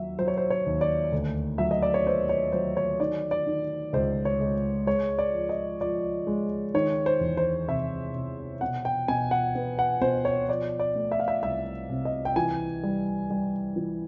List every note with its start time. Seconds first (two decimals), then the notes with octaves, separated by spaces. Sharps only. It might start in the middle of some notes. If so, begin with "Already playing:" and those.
Already playing: D#2 F#3 E5
0.19 F#3 C5
0.28 C#5
0.37 C5
0.50 C#5
0.66 D#2
0.81 D5
1.12 D2
1.58 F#3 E5
1.71 D#5
1.82 D5
1.94 C#5
2.06 B3 C5
2.29 C#5
2.52 F#3 C5
2.77 C#5
3.00 D#3 D5
3.31 D5
3.46 D#3
3.93 C#2 C5
4.25 C#5
4.40 C#2
4.87 G#3 C#5
5.19 D5
5.34 F3
5.49 D#5
5.81 F3 D5
6.27 G#3
6.74 D#3 C#5
7.06 C5
7.21 E2
7.37 C5
7.68 C3 E5
8.15 C3
8.61 B2 F#5
8.85 G5
9.08 B2 G#5
9.31 F#5
9.55 B3
9.79 F#5
10.01 B2 C5
10.25 C#5
10.48 F3 D5
10.80 D5
10.96 A3
11.12 E5
11.20 F5
11.28 E5
11.42 C2 E5
11.90 C3
12.05 D#5
12.25 G5
12.36 E3 G#5
12.83 G3
13.30 G3
13.76 E3